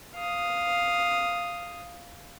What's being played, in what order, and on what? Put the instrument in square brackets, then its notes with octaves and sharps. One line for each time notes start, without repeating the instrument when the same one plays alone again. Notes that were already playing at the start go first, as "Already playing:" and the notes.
[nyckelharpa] F5 D#6